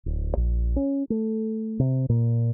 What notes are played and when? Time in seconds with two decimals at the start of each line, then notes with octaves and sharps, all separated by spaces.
0.06 D1
0.37 A#1
0.76 C#4
1.10 A3
1.79 C3
2.09 A#2